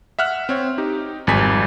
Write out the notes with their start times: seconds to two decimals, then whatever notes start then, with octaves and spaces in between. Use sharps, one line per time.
0.19 E5 F#5 F6 F#6
0.49 C4 C#5
0.78 D#4 G4
1.27 G#1 F2 G3 G#5 B6